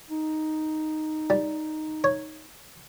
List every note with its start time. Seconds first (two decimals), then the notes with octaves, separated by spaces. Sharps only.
0.10 D#4
1.30 G3
2.04 C#5